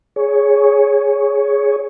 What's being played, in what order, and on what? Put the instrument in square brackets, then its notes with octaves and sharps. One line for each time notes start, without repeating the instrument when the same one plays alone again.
[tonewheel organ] G#4 C#5